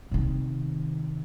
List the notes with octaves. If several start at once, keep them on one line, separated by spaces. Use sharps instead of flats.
C3 D#3